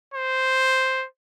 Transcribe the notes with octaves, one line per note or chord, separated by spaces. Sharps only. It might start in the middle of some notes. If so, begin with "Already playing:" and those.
C5